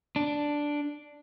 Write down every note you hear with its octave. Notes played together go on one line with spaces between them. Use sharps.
D4